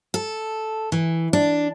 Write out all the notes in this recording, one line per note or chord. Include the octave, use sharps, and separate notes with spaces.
A4
E3
D4